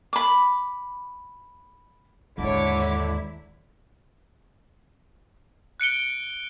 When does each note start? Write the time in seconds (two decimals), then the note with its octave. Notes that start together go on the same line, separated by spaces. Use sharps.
0.13 B5 D6
2.38 D#2 G#2 D3 E4 C#5 D6
5.80 F#6 C#7 D7 G7